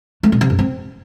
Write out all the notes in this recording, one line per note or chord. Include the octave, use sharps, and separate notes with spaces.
A3
B2
C3
F#2
C4